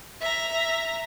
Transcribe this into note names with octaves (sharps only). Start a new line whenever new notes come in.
E5 A#5